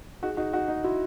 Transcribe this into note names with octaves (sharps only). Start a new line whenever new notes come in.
D#4 F#4 G#4
D#4 F#4
D#4 F#4 F#5
D#4
E4 F#4